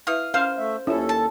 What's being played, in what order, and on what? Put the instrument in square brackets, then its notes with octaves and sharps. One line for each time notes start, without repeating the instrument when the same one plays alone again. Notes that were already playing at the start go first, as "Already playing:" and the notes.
[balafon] E4 B4 E5 [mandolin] F5 D#6
[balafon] C#4 C6 [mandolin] C5 [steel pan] F5
[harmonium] A3 E5
[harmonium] D#2 A4 [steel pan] C#4 E4 [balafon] F4 G4
[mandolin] A5